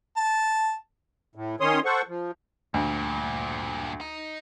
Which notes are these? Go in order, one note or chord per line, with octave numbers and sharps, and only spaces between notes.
A5
A2
D#3 C#4 C#5 C6 D#6
A4 C5 F#5 C#6
F3
D2 G2 A#2
D#4